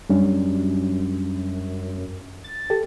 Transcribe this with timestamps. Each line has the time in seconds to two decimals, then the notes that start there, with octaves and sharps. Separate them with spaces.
0.10 F#2 G3 C#4 D4
2.44 A6
2.70 G4 A4